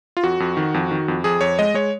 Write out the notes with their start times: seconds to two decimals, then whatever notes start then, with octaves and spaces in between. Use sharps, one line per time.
0.17 F4
0.23 F2 F#4
0.40 F2
0.57 D#3
0.74 F2
0.91 D#3
1.08 F2
1.24 F2 G#4
1.41 F2 C#5
1.59 G#3 D#5
1.74 G#3 C#5